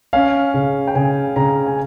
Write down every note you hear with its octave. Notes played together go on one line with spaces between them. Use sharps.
C#4 F5
C#3
G5
C#3 G#5
C#3 A#5
G#5